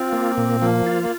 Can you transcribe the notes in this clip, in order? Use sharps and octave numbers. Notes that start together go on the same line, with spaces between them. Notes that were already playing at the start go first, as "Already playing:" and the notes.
Already playing: C4 F4
A#3
A#2
F3 A#3
F4
A#3